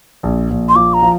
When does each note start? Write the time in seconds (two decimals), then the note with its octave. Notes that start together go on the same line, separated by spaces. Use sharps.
0.23 A#1
0.50 A#1
0.69 C6
0.76 F3 D6
0.94 A#5
1.03 F3